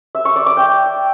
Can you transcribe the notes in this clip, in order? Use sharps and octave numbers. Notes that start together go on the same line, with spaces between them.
E5
C#6
D5
D6
G5